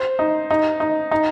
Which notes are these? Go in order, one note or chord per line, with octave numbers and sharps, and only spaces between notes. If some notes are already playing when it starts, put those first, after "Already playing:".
Already playing: C5
D#4
D#4
D#4
D#4